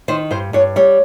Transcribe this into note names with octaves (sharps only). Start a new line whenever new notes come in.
D#3 C5
G2 C5
G2 C#5
G3 C#5